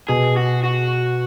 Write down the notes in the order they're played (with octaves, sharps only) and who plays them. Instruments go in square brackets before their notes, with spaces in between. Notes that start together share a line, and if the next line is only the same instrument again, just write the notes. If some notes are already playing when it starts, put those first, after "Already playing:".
[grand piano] B2 [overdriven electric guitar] G#4
[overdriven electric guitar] F#4
F#4